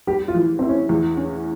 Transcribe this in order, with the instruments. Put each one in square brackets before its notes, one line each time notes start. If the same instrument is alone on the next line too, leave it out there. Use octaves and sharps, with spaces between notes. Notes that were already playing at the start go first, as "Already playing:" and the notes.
[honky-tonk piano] G3 [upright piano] G4
[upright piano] F4
[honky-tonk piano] E3
[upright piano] C4 [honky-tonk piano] E4
[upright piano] C#4
[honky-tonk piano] E2
C#4